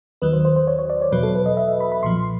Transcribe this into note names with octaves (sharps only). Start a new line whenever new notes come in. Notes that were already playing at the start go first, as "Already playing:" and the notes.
D#2 D#3 F#3 B4
C5
C5
C5
C#5
C#5
D5
C#5
E2 B2 F#3 B4
A4
B4
D#5
E5
B5
B5
B1 A#2 F3 C6